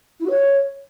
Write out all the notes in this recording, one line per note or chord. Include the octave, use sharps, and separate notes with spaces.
E4
F#4
C#5